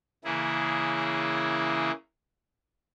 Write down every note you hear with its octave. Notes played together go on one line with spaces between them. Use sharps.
C#3 E3 A#3 E4 G#4